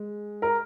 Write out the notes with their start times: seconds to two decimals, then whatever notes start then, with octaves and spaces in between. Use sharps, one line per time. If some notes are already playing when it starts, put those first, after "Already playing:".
Already playing: G#3
0.42 A#4